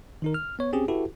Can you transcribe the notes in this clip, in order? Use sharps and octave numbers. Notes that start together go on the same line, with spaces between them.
D#3 D#4 A#4
F6
B3 C#5
C4 C#4 G4 G#4
E4 F#4 G4 A4 B4